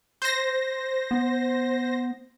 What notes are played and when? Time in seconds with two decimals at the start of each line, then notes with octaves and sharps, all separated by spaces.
0.22 C5 A#6
1.11 B3